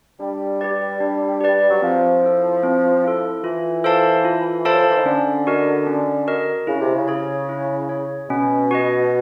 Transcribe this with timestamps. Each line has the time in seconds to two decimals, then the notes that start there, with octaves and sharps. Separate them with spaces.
0.20 G3 D4
0.61 G4 B4 D5
1.00 D4
1.41 G4 B4 D5
1.70 F#3
1.82 F3 C4
2.22 E4 A4
2.63 C4
3.04 E4 A4
3.43 E3 F4
3.84 A4 C5 F5 A5
4.25 F4
4.65 A4 C5 F5 A5
4.73 F#3
4.81 F3
4.90 E3
4.97 D#3
5.06 D3 C#4
5.47 F#4 A#4 D#5
5.87 C#4
6.27 F#4 A#4 D#5
6.67 C#3 E4
6.81 C3
6.95 C#3
7.08 G#4 C#5
7.49 E4
7.89 G#4 C#5
8.30 B2 C#4
8.71 F#4 B4 D#5